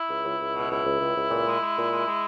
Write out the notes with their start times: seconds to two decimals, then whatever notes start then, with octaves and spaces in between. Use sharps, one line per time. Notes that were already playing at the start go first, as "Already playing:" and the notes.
Already playing: E4
0.09 C#2
0.24 C#2
0.40 C#2
0.54 B2
0.69 C#2 E4
0.84 C#2
1.00 C#2
1.15 C#2
1.30 A#2
1.45 G#3
1.60 G#3
1.75 A#2
1.91 G#3
2.06 G#3